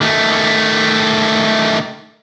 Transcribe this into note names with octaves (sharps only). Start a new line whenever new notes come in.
D#3 A3